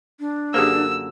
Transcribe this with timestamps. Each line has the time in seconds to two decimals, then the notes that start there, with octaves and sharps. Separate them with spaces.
0.20 D4
0.54 F#2 D3 A#3 G4 G#4 C5 E6